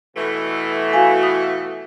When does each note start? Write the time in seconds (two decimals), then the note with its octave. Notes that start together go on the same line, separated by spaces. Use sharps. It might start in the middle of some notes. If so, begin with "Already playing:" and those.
0.16 B2 E3 A3
0.93 F#4 F5 G#5
1.23 D#6